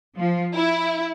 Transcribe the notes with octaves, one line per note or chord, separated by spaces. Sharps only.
F3
E4